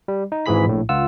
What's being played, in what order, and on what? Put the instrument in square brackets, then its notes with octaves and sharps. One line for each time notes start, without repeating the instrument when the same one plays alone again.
[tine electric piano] G3
D#4
G#1 G#2 E3 G#4 B5 B6
A#1 A2
C#2 F4 F#5 E6